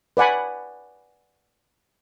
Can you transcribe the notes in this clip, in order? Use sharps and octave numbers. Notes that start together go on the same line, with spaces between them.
B4 D5 F#5 G#5 B5